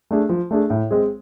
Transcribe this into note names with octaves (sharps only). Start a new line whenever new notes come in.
A3 D4 G#4
F3
A3 D4 G#4
A2
G#3 C4 G#4